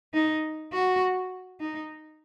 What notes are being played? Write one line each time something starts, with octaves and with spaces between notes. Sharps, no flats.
D#4
F#4
D#4